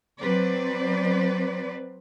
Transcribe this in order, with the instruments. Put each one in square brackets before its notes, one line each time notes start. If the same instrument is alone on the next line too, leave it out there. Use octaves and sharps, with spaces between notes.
[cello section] F#3 C4 B4 C5 D5